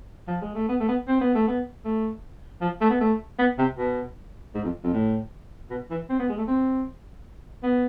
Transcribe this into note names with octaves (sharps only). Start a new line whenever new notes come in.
F3
G#3
A3
B3
A3
B3
C4
B3
A3
B3
A3
F3
A3
B3
A3
B3
C3
B2
G#2
F2
F2
A2
B2
E3
C4
B3
G#3
A3
C4
B3